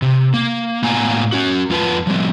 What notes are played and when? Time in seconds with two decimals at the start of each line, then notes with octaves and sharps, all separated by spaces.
0.02 C3
0.34 A#3
0.84 A2 A#3 B3 F5 G#5 A#5
1.32 C#4 F#4
1.70 F2 F4 B4 A5
2.07 F3 G3 C4